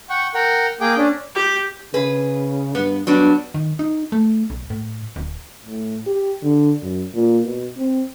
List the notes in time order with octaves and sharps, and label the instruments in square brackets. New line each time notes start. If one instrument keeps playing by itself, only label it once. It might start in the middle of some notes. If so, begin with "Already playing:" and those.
[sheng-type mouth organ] F#5 G5 C#6
A#4 F#5 G5
A#3 G#4 G5 D6
C#4 D4
[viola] G4
[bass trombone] C#3 [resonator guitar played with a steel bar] G#4 B4
[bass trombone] G2 [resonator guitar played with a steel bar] B3
[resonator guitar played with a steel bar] F#3 G3 D4 [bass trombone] B3
[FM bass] D#3
D#4
A3
B1
A2
D1
[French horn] A2
G4
D3
F#2
A#2
B2
C4